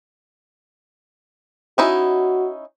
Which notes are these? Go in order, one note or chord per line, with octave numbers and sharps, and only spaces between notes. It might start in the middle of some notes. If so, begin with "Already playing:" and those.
C#4 D#4 E4 F#4